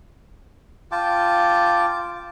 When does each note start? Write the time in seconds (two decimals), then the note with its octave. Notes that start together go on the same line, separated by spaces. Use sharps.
0.92 F4 G5 A5 D6